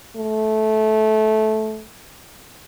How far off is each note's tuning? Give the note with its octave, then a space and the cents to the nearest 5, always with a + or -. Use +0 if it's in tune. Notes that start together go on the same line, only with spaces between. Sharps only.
A3 -15